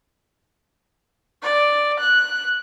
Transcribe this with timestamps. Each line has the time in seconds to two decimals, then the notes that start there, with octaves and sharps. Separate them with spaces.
1.43 D5
1.99 F#6